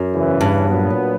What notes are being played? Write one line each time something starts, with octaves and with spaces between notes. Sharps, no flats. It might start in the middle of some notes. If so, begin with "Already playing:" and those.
Already playing: F#2
E2 C#3 E3
G2
A#2 F#3 B3